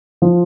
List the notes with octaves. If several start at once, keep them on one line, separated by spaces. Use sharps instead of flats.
F3 F4